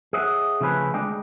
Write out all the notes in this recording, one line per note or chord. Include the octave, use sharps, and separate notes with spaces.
G#4 C#5 D#5 E5 F#5
C#3 F3 A3 C#4 B4
D2 D3 G#3 D4 D#5 G5